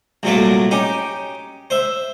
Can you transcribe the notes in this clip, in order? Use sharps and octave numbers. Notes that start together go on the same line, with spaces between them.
C2 A#2 F#3 A3 A#3
C#4 D#4 G4
C5 E5